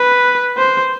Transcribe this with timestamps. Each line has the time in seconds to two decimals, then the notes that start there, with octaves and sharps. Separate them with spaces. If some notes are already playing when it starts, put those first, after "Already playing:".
Already playing: B4
0.57 C5